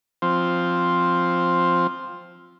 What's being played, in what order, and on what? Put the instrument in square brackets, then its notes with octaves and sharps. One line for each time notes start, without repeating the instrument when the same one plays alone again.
[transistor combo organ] F3 C4